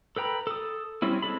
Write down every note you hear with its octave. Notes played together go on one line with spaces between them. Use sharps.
A4 B4 G5 A#5 B5
A4 D#6
G3 C4 C#4 E4
G#3 C4 A4 B5